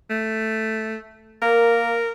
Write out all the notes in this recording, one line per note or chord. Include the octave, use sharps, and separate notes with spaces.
A3
A#3 A#4